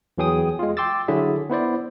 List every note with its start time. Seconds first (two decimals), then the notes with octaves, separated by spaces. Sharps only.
0.18 E2 E3 F#3 G#4 G5 D#6
0.59 G#3 F4
0.77 G5 C6 D6 E6 A6
1.08 D3 F#3 E4 G#4 E5
1.50 B3 E4 C5 D5